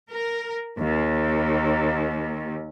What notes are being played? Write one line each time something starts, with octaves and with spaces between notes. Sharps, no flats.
A#4
D#2